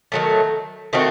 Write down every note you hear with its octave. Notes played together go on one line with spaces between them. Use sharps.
D#3 F#3 A3
D#3 A3 C4 F#4